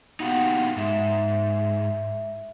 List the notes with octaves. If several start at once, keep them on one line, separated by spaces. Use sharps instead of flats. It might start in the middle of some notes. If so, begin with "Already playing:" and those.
B3 D#4 F#4 G4 F5 F#5
G#2 E5